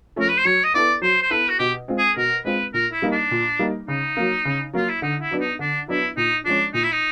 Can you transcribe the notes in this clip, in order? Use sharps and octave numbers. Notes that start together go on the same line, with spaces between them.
F3 A3 C#4 A#4
B4
C5
F#3 C#5
D#5
B3 E4 A4 D5
F#3 C5
C5
B3 E4 A4 B4
F#4
B2 G4
G#3 C4 F4
G#4
B2 A#4
G#3 C4 F4 B4
A#2 A#4
E4
G3 A#3 D#4
D4
A#2
G3 A#3 D#4
C#3 D#4
F#3 A#3
C#3
F#3 A#3 F4
E4
D3 D#4
E4
F#3 B3 D4
D#4
D3 D4
F#3 B3 D4 E4
A#2 D#4
F3 G#3 C#4 D4
A#2 D#4
E4
D#4